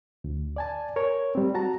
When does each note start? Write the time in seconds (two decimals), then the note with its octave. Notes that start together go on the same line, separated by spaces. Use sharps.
0.24 D2
0.56 D5 G#5 A5
0.96 A#4 C#5
1.35 G3 C4
1.54 F#4 A5 A#5